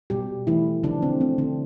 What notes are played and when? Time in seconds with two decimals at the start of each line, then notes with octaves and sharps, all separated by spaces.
0.10 B2 G3 G4
0.47 E3 A3 E4
0.83 D3 F3 D4
1.02 C4
1.20 A3 C4
1.38 D3 D4